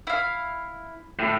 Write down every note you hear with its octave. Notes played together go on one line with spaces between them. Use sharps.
E4 F5
A2